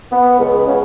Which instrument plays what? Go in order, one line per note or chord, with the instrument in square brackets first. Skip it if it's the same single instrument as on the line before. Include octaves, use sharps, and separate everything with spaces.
[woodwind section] B3
C#2
C#3